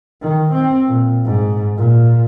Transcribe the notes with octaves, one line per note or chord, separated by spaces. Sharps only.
D#3
C4
A#2
G#2
A#2